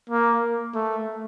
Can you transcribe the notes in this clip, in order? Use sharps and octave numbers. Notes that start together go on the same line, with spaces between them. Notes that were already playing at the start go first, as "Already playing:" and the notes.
A#3
A3